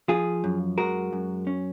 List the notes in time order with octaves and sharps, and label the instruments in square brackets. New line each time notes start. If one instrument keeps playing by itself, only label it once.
[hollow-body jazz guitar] F3 F4 G#4
F#2
G#3 F#4 A#4
F#2
C#4